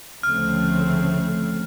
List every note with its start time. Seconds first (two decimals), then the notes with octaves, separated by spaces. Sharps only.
0.23 D2 C#3 F3 A3 C4 F6